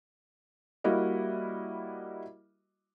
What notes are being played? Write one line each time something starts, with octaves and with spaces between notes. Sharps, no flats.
G3 A#3 E4 F#4 D#5